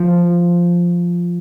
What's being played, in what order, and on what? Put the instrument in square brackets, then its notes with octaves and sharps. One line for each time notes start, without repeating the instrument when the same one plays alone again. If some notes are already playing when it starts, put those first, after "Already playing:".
Already playing: [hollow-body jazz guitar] F3